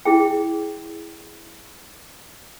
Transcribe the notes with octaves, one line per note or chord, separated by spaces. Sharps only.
E4 G#4 G5